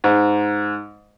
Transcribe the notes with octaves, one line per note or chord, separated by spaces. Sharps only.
G#2